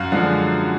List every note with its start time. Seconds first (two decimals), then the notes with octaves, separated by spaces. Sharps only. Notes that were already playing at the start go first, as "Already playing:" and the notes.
Already playing: F#2 F5 F#5
0.12 D3 F3 G#3 F5